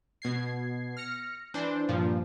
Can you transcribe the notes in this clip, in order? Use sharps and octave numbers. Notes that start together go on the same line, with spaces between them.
B2 G#6 C7
F6 A#6 C#7
E3 D4 C5
G2 A#2 F3